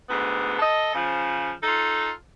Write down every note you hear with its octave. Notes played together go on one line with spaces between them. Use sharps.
D2 G#2 B3
A4 D#5
C#3 F3
D#4 F4 A4